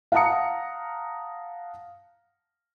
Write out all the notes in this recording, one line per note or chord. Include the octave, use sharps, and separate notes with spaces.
F5 F#5 A5 A#5 D#6 C#7